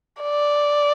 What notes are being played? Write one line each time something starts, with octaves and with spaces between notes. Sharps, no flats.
D5